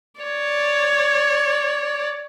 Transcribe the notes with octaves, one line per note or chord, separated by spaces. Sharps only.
C#5 D5